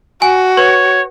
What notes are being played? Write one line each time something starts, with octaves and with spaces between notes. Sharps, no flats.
F#4 G#5
B4 C#5